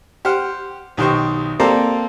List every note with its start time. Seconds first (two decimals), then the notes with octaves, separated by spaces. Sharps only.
0.25 G4 C5 F#5 F6
0.97 B1 D#3 G4 C5 C#6
1.60 A#3 C4 A4 C5 D5 A#5